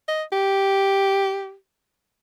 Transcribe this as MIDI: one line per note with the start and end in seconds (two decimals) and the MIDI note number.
0.08 0.23 75
0.32 1.55 67